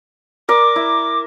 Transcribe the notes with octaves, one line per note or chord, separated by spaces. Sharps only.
A#4 D5 D6
E4